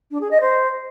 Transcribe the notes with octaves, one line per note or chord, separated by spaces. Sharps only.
D4
G#4
D#5
C5